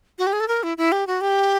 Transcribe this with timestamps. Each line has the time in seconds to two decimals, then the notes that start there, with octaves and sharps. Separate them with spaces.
0.19 F#4
0.27 G4
0.33 G#4
0.40 A4
0.48 A#4
0.63 E4
0.78 E4
0.92 G4
1.07 F#4
1.21 G4